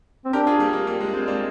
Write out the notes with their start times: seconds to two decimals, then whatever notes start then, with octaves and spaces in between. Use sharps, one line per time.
0.25 C4
0.33 D4 G4 A#4
0.47 F4 G#4
0.60 G3 A#3
0.73 G3 A#3
0.87 G3 A#3
1.01 G#3
1.13 G#3 C4
1.27 A#3 D4